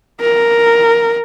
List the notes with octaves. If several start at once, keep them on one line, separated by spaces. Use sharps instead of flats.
A#4